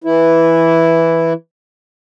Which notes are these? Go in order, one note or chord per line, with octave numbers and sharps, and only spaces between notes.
E3 E4